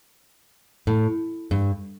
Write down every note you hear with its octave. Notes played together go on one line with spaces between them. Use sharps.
A2
G2